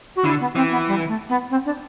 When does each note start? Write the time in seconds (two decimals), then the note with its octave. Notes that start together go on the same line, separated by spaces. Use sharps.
0.16 F#4
0.24 D3 E4
0.40 B3
0.56 E3 C4
0.71 B3
0.87 G3
1.08 A3
1.29 B3
1.50 C4
1.65 D4